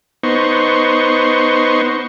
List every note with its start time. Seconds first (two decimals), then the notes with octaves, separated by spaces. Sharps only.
0.23 B3 D#4 C5 C#6